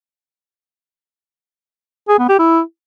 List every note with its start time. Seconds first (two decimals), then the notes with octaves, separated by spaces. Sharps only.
2.09 G#4
2.19 B3
2.29 G4
2.39 E4